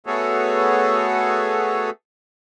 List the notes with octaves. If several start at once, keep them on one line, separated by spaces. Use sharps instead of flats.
A3 B3 F#4 G#4 A4 C#5